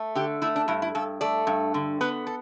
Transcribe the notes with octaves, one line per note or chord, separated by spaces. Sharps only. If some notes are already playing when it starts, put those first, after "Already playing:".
Already playing: A3
D3 G4
A3 E4
D4
G2 E4
E4
G2 A4
A3 D5
G2
D3
B3 B4
A4